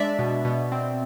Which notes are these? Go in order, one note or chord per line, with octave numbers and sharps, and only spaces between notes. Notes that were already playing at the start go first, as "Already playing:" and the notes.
Already playing: G#3 D4 D5 E5
B2
B2
C4